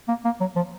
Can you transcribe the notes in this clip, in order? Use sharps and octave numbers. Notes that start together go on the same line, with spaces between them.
A#3
A#3
F#3
F3